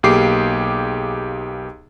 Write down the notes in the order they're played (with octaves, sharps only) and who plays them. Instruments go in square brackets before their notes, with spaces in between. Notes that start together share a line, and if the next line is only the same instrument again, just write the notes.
[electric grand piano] B1 A#3 G4 G#4 D6 C7